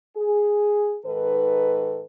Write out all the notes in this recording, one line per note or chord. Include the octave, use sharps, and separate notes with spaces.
G#4
G#2 D#3 A4 B4